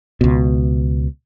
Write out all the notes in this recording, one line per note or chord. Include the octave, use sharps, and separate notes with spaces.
C#2 B2